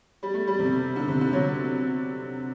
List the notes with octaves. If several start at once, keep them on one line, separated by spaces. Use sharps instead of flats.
G3
A3
G3
C3
D3
C3
D3
F#3